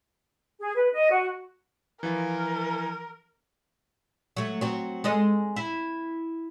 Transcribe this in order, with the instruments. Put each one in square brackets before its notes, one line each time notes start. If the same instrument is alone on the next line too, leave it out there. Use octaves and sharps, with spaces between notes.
[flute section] G#4
B4
D#5
F#4
[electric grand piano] E3 F3 F4 [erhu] A#4
[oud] F#3 A3
F#3 C4
G#3 A4 D#5
E4